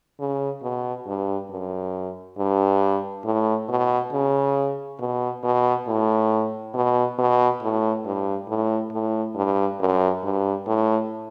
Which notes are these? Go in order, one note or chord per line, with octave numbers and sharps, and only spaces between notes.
C#3
B2
G2
F#2
G2
A2
B2
C#3
B2
B2
A2
B2
B2
A2
G2
A2
A2
G2
F#2
G2
A2